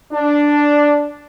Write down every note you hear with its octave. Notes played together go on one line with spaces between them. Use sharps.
D4